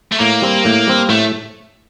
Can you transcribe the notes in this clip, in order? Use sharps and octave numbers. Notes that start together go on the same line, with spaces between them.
A3
A2 A#3
G3 C4
A2
G3 C4
A2 A3